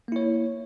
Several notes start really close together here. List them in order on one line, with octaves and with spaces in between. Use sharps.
A#3 E4 C#5